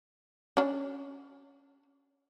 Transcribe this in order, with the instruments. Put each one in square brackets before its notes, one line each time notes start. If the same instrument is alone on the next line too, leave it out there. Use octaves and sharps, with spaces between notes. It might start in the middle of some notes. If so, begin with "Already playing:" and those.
[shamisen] C#4 D4